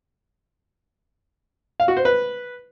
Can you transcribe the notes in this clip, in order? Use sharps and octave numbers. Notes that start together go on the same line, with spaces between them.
F5
F#4
C5
B4